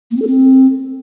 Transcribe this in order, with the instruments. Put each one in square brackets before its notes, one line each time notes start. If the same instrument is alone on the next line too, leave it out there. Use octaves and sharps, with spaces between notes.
[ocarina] A#3
C4
A4
C4